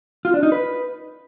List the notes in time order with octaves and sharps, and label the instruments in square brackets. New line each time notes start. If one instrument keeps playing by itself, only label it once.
[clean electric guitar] F4
D4
D#4
B4